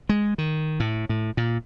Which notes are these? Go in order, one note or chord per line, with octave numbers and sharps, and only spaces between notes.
G#3
D#3
A2
A2
A#2